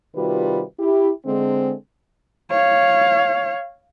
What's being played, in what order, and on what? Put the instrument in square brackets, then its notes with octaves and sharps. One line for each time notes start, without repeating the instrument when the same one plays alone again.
[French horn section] C3 D#3 G3 F4 F#4 B4
E4 G4
D3 G#3 C4
[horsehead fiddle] C#5 F5